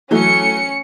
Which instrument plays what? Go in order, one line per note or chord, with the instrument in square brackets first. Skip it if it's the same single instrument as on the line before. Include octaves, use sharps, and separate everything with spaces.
[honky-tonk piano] E3 F#3 A3 [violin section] C#4 C#7